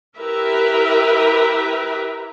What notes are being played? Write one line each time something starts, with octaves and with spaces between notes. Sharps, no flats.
E4 G4 A#4 B4 E5